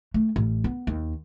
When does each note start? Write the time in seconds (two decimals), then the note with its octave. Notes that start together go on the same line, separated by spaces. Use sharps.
0.14 A3
0.36 A1
0.64 B3
0.87 D#2